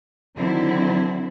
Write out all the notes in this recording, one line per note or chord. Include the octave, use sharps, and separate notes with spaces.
D3 D#3 F#3 C4 E4